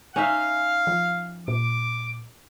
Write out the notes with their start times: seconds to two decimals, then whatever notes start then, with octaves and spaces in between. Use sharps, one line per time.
0.16 C#4 D#4 E5 F5
0.87 F3
1.48 A#2 D6